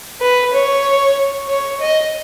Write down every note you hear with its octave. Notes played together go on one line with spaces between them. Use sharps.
B4
C#5
C#5
D#5